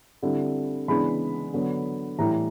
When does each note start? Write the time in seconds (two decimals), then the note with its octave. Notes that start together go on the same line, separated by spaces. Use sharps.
0.23 D3 G3 C4 E4
0.88 C#3 E3 G#3 B3 D4 B5
1.53 D3 F#3 B3
2.18 A2 E3 G3 A#5
2.31 A#5